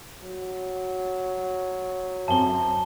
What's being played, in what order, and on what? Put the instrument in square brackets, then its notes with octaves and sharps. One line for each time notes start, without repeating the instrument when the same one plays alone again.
[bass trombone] F#3
[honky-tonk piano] F#2 C4 [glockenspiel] A5 G7